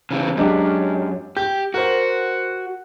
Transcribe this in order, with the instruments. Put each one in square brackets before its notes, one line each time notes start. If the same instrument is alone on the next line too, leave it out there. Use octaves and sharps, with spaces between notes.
[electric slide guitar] C#3 E3 C4
[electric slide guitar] F#2 [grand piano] G#3 D4 G4
[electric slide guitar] G4 [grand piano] G6
[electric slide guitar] F#4 [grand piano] A#4 C5